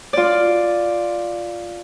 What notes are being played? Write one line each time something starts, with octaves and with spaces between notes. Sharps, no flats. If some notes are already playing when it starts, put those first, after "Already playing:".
F4 D5